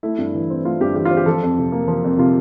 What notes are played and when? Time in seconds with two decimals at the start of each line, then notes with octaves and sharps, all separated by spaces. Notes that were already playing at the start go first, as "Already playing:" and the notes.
0.03 A3 E4
0.18 G2
0.34 E3
0.50 C4
0.64 A3 F4
0.81 G2 G4
0.96 E3 G4
1.05 F4
1.11 C4
1.17 G4
1.26 F3 A4
1.43 F2
1.58 C3
1.72 A#3
1.88 F3
2.04 F2
2.18 C3 F4